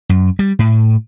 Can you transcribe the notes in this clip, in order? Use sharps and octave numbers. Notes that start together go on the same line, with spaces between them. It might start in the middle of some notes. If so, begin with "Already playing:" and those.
F#2
G3
A2